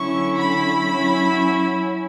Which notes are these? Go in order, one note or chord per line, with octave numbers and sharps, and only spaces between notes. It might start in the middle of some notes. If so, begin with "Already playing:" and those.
Already playing: D3 F#3 C#4 E4 C#6
B5
F#3 C#4 E4